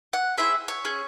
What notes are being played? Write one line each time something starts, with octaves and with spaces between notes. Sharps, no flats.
F#5
C4 E4 G#4 E5
C#5
C#4 G#4